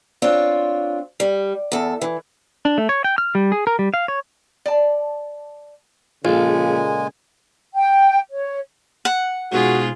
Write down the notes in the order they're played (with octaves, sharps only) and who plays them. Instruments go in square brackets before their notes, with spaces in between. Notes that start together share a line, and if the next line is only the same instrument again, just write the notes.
[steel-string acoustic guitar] C4 D4 F4 C#5
G3
E2 A4
E3
[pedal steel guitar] D4
A3
C#5
G5
F6
G3
G#4
A#4
G3
F5
C#5
[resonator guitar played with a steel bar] D5 A5
[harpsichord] A#1 [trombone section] A#2 C#3 [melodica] G#3 G#5 [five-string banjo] F4 A4
[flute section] G5
C#5
[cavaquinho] F#5
[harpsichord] G#2 B2 G#3 [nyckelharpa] F4 G#4 [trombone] F#4